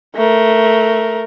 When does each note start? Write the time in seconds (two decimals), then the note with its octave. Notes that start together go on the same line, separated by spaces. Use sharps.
0.15 A3 A#4